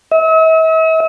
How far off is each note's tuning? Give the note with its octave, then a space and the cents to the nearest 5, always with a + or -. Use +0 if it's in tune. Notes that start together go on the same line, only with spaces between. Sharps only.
E5 -45